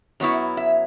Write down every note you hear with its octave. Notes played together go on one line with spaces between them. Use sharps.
F#2 F#3 B3 E4 C#5
E5